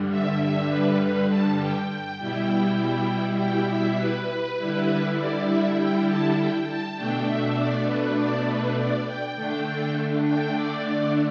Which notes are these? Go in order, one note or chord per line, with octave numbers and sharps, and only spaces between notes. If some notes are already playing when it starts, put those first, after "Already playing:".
Already playing: G2 D3 G3
E5
E5
B4
B4
A5
G5
G5
B2 G3 E4 G5
G5
E5
B4
D3 G3 E4
D5
E5
G5
A5
G5
A5
B2 A3 D4 G5
E5
D5
B4
D5
B4
D5
G5
D3 A3 D4 G5
G5
D5
D5